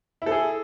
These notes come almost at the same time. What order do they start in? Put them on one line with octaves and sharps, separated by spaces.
E4 A4 G#4